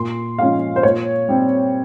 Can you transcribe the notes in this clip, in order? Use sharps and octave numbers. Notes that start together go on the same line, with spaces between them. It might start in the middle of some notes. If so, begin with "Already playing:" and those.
Already playing: A#2 C6
F3 G#3 C#4 F5
C5
A#2 C#5
G3 C4